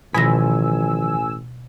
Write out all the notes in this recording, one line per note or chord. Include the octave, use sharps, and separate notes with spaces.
A1 B2 D#3 F3 G#5 B5 E6 A#6